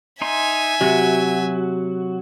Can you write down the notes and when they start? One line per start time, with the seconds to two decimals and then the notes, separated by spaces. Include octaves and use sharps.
0.22 D#4 E5 G#5 C6
0.81 C3 F#3 F#4